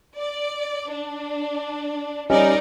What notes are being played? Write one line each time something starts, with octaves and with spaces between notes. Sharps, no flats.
D5
D4
G3 C#4 D#4 A#4 D5 D#5